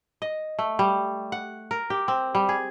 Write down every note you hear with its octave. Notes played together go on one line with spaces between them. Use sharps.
D#5
A3
G3
F#5
A#4
G4
C4
G3
G#4